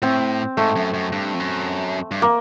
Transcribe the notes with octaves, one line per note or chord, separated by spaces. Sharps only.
A2 C4
G#2 A3
F#2
F#2
G2
F2
F#2
G2
A#3